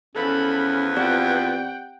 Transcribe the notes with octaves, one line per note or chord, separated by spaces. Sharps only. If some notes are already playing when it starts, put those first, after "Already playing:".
E2 F3 C#4 A4 B4 B5
C4 F4 G4 D5 F#5 G5